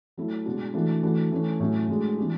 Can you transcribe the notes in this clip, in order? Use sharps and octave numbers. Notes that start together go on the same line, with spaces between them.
F#3 A3 E4
B2 G#3 D4 F#4
E3 A3 D4 F#4
E3 A3 D4 F#4
E3 A3 C#4
A2 F#3 C#4
A2 G#3 D4 F#4
E3 B3 D4 F#4